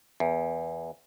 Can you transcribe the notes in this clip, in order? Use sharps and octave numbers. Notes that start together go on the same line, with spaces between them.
E2